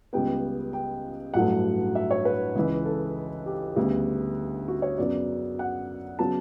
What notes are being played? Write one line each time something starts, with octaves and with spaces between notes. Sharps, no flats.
C#2 C#3 G3 B3 G5
G5
A1 G2 F#3 A3 F#5
E5
C#5
B4
C#2 C#3 E3
A4
G4
D2 C#3 G3 B3
F#4
C#5
F#2 C#3 F#3 B3 D5
F#5
C#3 F#3 B3 A5